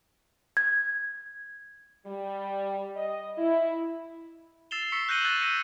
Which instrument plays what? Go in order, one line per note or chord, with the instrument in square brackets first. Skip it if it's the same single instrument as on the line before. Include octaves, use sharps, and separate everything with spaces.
[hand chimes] G#6
[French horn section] G3
D#5
E4
[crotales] E6 A6 C7 E7 F7 G7
C#6 E6 B6 C#7
F#6 G6 A#6 D#7 F#7 G7
E6 F#6 G#6 A6 D#7
E6 A#6 C#7 D#7